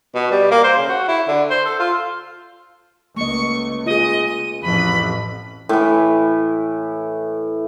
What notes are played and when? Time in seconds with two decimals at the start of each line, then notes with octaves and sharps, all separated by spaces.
0.14 B2
0.31 G3
0.51 A#3
0.64 C5
0.77 C#3
0.89 F#4
1.08 E4
1.28 D3
1.50 C5
1.66 A4
1.80 F4
3.16 C#2 A3 A#3 D#5 C#6
3.86 F4 G#4 D#5
4.28 D#7
4.62 A1 F2 B5
5.69 A2 E3